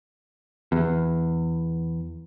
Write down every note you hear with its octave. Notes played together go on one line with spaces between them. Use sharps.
E2